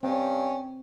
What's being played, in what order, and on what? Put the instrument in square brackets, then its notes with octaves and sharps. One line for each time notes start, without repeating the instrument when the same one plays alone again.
[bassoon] G2 [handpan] C4 [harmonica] C#4 [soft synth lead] G5